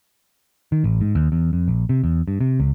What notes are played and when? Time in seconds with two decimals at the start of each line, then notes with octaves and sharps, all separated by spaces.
0.72 D#3
0.84 A1
1.01 G#2
1.15 D#2
1.32 E2
1.53 F2
1.68 A#1
1.89 C3
2.04 E2
2.28 G2
2.41 C3
2.60 C#2